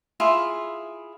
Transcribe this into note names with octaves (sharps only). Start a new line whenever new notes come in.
E4 F4 G#4